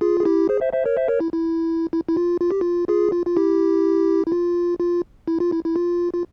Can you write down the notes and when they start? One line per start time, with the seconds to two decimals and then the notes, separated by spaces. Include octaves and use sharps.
0.01 F4 G#4
0.20 G#4
0.25 E4 G4
0.49 G#4 C5
0.61 C5 E5
0.73 C5 E5
0.85 A#4 C#5
0.97 C5 E5
1.08 A#4 C#5
1.20 E4
1.33 E4
1.93 E4
2.08 E4
2.17 F4
2.41 F4
2.51 G4
2.61 F4
2.88 F4 G#4
3.12 F4
3.26 F4
3.37 E4 G4
4.27 E4
4.32 F4
4.80 F4
5.28 E4
5.40 F4
5.52 E4
5.65 E4
5.76 F4
6.13 F4